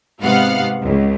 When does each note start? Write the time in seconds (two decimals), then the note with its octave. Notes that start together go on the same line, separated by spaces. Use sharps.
0.22 G#2 C3 B3 F5 F#5 F6
0.83 C#2